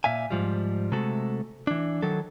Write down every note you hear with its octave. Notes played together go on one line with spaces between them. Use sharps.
A#2 E5 F5 G#5
G#2 F3 G3
C3 G#3 A3 F#4 A4
E3 D4
D#3 F#3 A4